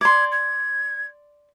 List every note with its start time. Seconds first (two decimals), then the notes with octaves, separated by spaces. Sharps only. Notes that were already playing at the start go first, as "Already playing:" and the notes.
0.01 D5 C6 G#6
0.31 G#6